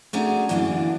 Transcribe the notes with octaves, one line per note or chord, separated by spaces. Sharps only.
A3 C#4 D4 F#4 G#4 A#5
F#2 D3 E3 A#3 D4